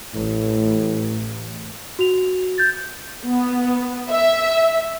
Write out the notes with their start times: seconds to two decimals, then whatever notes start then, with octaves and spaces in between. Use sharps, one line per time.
0.14 A1 A2
1.99 F#4 F7
2.58 G6 A6
3.24 B3
4.10 E5